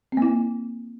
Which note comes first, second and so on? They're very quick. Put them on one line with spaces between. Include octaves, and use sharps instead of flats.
C4 A#3 E4